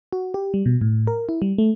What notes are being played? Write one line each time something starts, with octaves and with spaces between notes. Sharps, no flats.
F#4
G4
G3
B2
A2
A#4
E4
G3
A3